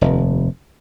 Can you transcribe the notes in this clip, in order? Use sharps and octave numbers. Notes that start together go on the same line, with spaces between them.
F1 D#2